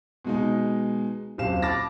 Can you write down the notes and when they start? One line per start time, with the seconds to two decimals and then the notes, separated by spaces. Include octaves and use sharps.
0.25 B2 G#3 D#4
1.38 D#1 F#2 C4 F5 E7
1.62 A5 B5 D6 F6 A6 A#6